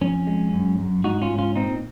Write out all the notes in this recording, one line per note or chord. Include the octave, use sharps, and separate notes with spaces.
F2 C#4
G#3
F#2
F#2
G#2 D#4 F#4
C#4 F4
G#2
C#4 F4
A#2 C4 D#4